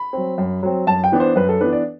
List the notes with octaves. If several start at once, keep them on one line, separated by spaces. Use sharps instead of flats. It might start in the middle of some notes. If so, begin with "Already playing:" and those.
Already playing: B5
F#3 C4
F#2
F#3 C4
F#2 A5
G5
E3 B3 D4
C5
F#2 B4
A4
E3 B3 D4 B4
D5